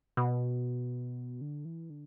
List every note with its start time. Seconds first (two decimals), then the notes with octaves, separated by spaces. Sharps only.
0.17 B2
1.41 D3
1.65 E3
1.90 D3